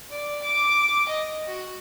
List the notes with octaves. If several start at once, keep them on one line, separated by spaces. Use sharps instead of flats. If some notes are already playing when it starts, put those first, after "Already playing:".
D5
D6
D#5
F#4